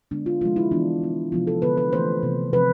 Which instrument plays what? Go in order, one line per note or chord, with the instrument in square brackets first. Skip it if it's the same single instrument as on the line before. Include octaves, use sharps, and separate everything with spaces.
[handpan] D3 G#3 B3 D4
F4
C3 F3 G#3 F4
E4
E3 B3 D4
D3 G#3 B3
C3 F3 B3 F4
A4
D3 G#3 B3 B4
B4
E3 A3 C4 C5
C3 E3 B3
C3 F3 A3 C4 B4